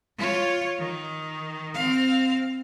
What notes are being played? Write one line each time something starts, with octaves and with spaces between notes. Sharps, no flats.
F4 C#5
D#3
C4 F5